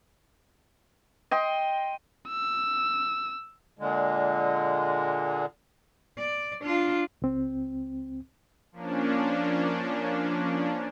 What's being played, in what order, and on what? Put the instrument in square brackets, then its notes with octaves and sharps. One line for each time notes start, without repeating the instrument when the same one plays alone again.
[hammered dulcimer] D#5 G5 C6
[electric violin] E6
[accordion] A#2 D3 G#3
[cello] D5
D4 F4
[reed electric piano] C#2 C4
[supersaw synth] F3 A#3 C#4 D4